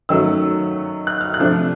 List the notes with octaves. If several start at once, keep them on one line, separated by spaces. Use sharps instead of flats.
D#3 F#3 A3 C#4 E6
F#6
F6
F#6
C3 F3 A3 D4